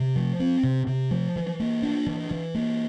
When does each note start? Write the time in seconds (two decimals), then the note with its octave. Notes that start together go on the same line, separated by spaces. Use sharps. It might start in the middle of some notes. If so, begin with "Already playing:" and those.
Already playing: C3
0.16 F3
0.39 C4
0.63 C3
0.87 C3
1.11 F3
1.36 E3
1.60 A#3
1.82 D4
2.06 E3
2.31 E3
2.55 A#3